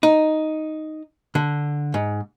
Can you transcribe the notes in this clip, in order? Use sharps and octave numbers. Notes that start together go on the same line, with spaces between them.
D#4
D3
G#2